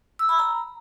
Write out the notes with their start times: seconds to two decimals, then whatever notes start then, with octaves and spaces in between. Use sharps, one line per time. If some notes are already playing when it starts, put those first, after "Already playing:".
0.19 E6
0.29 B5
0.39 A#5